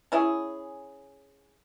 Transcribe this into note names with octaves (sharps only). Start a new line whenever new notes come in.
C#4 E4 G#4